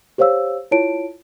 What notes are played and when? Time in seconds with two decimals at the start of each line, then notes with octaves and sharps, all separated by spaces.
0.18 G4 C5 C#5 F5 E6
0.71 E4 F4 C#5 A5 D7